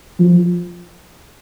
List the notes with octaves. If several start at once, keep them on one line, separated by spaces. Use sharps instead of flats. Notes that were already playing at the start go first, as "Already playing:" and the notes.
F3